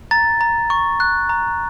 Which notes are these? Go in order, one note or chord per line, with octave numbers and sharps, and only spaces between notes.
A#5 A6
A#5
C#6
F#6
A#5